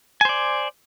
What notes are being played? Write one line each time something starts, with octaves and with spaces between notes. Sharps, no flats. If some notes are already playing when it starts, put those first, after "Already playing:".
C5 D5 G#5